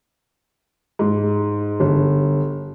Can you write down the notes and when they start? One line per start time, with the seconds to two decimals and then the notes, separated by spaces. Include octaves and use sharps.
0.99 G#2
1.80 G1